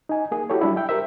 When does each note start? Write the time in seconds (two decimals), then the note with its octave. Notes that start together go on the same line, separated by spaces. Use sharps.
0.09 D#4 G#5
0.31 A#3 G#4
0.50 E4 F#4 G4 A4 C#5
0.61 F#3 G3 D4 E4
0.77 E5 G5
0.89 G4 A#4 C5 E5